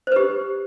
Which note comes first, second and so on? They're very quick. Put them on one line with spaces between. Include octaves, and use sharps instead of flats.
C5 B4 G4